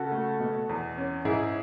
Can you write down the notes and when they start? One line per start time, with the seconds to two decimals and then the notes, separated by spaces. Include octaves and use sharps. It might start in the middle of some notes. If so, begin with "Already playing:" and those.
Already playing: C#3 F#4 A4
0.12 A3
0.40 B2
0.69 E2
0.98 C#4
1.25 G#2 E4 G#4